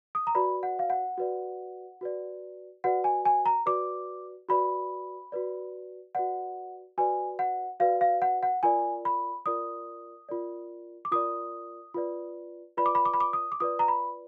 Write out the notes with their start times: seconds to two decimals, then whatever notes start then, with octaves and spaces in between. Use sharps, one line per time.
0.15 D#6
0.27 A#5
0.35 F#4 B4 D5 B5
0.63 F#5
0.79 F5
0.90 F#5
1.18 F#4 B4 D5
2.01 F#4 B4 D5
2.84 F#4 B4 D5 F#5
3.04 G#5
3.25 G#5
3.46 A#5
3.66 F#4 B4 D5 D6
4.49 F#4 B4 D5 B5
5.32 F#4 B4 D5
6.15 F#4 B4 D5 F#5
6.98 F#4 B4 D5 G#5
7.39 F#5
7.80 F#4 B4 D5 F5
8.01 F5
8.22 F#5
8.43 F#5
8.63 F4 A#4 D5 G#5
9.05 B5
9.46 F4 A#4 D5 D#6
10.29 F4 A#4 D5
11.05 D6
11.12 F4 A#4 D5 D#6
11.94 F4 B4 D5
12.77 F4 B4 D5 B5
12.86 D6
12.95 B5
13.05 D6
13.14 B5
13.20 D6
13.33 D#6
13.52 D6
13.60 F4 B4 D5 D#6
13.79 A#5
13.88 B5